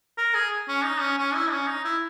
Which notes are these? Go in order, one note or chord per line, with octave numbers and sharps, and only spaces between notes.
A#4
G#4
C#4
D#4
C#4
C#4
E4
C#4
D#4
E4